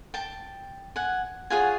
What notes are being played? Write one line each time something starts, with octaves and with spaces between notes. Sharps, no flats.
G5 A5
F#5 G#5
F4 G#4 C#5 F#5 G#5